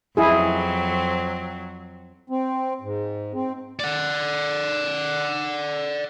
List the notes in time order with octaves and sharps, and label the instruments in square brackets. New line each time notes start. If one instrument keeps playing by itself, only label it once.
[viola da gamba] F2 F#3 C4 [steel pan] E4 G#4
[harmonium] C4
G#2
C4
[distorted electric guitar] D5 F#5